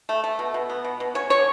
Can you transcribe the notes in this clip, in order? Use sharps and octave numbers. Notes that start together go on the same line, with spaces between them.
A3
A3
B2
B2
B3
B2
B2
C#4 C#5
D3 C#5